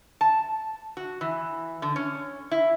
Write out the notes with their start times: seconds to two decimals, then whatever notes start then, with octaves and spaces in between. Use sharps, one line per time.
0.21 A5
0.97 F#4
1.21 E3
1.82 D3
1.96 C#4
2.51 E4